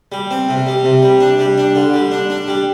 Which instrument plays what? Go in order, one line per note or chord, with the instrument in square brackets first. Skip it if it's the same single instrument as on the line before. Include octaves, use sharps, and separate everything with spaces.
[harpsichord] G3
C4
C3
G3
C3
G3
D4
G3
D4
D3
G3
D4
D4
G3